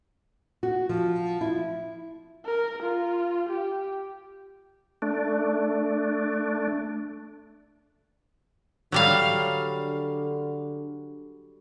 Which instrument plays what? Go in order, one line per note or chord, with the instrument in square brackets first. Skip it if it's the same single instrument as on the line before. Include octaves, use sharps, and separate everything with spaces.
[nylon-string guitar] F#4
F3
E4
[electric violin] A#4
F4
G4
[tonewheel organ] A3 D4
[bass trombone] D3 [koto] F#3 G3 F5